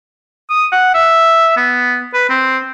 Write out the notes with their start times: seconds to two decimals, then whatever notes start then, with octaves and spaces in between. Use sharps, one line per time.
0.50 D#6
0.72 F#5
0.94 E5
1.57 B3
2.14 B4
2.30 C4